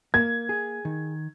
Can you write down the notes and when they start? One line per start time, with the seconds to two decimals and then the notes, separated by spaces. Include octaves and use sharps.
0.14 A#3 G#6
0.49 G#4
0.85 D#3